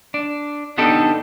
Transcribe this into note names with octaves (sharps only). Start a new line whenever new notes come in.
D4
B3 D4 D#4 G4 A4